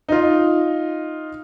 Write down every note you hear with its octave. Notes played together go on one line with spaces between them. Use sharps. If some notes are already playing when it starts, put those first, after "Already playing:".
D#4 F4